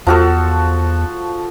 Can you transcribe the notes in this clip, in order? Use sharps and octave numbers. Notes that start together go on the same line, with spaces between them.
E2 F3 F#4 A4